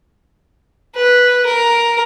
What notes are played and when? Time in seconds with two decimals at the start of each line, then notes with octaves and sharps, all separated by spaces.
0.96 B4
1.46 A#4